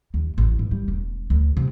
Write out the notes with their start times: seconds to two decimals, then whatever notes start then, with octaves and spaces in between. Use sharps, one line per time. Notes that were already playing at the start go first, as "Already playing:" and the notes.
0.14 D#2
0.38 A1
0.59 G#1
0.71 G3
0.88 E1
1.30 D2
1.57 C3